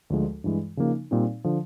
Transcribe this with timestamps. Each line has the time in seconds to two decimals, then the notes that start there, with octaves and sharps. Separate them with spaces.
0.10 D2 D3 F3 G#3
0.44 G2 E3 G#3
0.77 C#3 F3 A#3 D#4
1.11 A#2 G3 C4 D#4
1.44 D3 F3